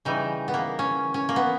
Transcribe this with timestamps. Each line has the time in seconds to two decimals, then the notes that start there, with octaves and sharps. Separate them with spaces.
0.05 C#3 E3 G3 D#4
0.48 B3
0.54 A#3
0.79 C#4
1.14 C#4
1.29 A#3
1.36 B3